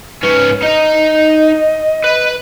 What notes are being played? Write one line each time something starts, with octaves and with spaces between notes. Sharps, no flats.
G#2 C#4 B4
D#4 D#5 A#5
B4